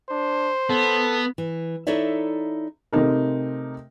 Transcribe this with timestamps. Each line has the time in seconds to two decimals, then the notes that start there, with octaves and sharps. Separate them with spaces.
0.10 D4 C5
0.70 B3 A4
1.38 E3
1.87 D#4 E4 A4 C#5 D5 E5
2.93 C3 A3 C4 D#4 A#4